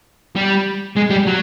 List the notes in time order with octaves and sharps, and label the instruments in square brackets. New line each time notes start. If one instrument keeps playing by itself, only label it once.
[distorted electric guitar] G3
G#3
G3
F#3